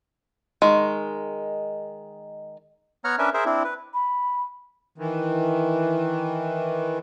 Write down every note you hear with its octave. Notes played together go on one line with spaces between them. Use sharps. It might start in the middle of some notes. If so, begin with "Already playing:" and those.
D#3 G#3
B3 C#5 F#5 A#5 F6
C#4 D4 A#4 B4 E5
G#4 A#4 C5 E5
C4 D4 E4
B4
B5
D#3 E3